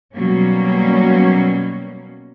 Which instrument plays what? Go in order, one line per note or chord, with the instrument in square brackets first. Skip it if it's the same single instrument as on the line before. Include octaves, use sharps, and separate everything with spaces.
[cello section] B2 F#3 G3 A#3 C#4